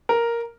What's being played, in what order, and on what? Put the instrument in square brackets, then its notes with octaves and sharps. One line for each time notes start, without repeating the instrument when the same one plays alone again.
[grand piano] A#4